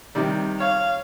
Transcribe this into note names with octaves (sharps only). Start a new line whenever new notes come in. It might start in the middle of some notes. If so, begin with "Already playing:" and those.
C3 D#3 G3
C#5 F5